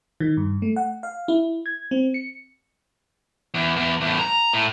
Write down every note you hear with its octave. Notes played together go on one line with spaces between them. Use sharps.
D#3
G2
A3
F#5
F5
E4
G#6
C4
C#7
E2
E2
E2 A2
A#5
A2